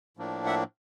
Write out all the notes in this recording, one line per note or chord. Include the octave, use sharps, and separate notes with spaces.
A2 F3 A#3 D4
E5 F#5